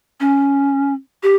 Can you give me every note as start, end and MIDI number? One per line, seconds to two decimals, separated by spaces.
0.20 0.94 61
1.23 1.35 67